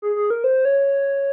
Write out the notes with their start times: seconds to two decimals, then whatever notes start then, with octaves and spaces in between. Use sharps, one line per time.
0.02 G#4
0.16 G#4
0.30 A#4
0.44 C5
0.65 C#5